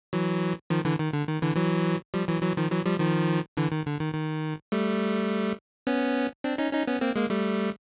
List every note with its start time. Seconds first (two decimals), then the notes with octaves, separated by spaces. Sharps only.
0.13 E3 F#3
0.70 D#3 F3
0.85 D3 E3
0.99 D#3
1.13 D3
1.28 D#3
1.42 D3 E3
1.56 E3 F#3
2.14 F3 G3
2.28 E3 F#3
2.42 E3 F#3
2.57 D#3 F3
2.71 E3 F#3
2.86 F3 G3
3.00 D#3 F3
3.57 D3 E3
3.72 D#3
3.86 D3
4.00 D#3
4.14 D#3
4.72 G3 A3
5.87 B3 C#4
6.44 C4 D4
6.58 C#4 D#4
6.73 C#4 D#4
6.87 B3 C#4
7.01 A#3 C4
7.16 G#3 A#3
7.30 G3 A3